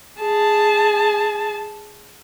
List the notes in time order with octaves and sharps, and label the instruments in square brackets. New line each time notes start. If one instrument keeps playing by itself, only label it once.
[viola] G#4 A5